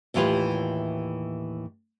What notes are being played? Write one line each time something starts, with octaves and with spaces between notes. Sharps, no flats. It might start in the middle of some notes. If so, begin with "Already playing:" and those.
D#2 A2 E3 F4 G4 B4